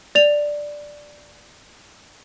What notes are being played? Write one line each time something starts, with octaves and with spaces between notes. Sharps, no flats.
D5 F7